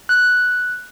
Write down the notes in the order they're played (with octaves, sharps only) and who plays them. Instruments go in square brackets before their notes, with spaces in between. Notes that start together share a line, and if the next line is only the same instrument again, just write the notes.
[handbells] F#6